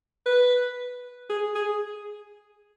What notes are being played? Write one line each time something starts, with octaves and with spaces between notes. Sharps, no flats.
B4
G#4
G#4